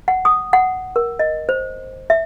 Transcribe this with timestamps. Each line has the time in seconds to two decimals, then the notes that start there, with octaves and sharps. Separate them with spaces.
0.08 F#5
0.25 D#6
0.53 F#5
0.96 A#4
1.19 D#5
1.49 C5
2.10 E5